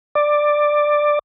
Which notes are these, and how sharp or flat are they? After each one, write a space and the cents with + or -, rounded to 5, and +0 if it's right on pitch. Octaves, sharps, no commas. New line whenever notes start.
D5 +10